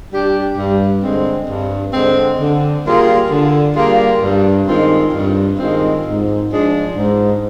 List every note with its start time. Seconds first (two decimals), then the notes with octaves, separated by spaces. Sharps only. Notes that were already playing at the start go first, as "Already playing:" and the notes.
0.11 G3 D4 G4
0.57 G2
1.03 D3 G#3 C4
1.48 G2
1.94 D3 G#3 C4
2.40 D3
2.85 G3 A#3 F4 G#4
3.31 D3
3.76 G3 A#3 F4 G#4
4.22 G2
4.67 D#3 G#3 C4 F4
5.13 G2
5.59 D#3 G#3 C4 F4
6.04 G#2
6.50 F3 G#3 D4 G#4
6.95 G#2